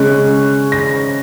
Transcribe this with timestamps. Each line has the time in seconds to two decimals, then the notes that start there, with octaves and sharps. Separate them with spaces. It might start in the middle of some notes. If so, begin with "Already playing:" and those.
Already playing: C#3 G#3 C#4 F#6
0.72 A#6